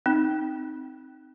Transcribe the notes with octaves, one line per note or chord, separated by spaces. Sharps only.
C4 D#4